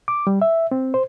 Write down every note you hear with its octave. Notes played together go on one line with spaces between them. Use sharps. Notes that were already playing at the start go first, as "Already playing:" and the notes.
D6
G3
E5
C4
C5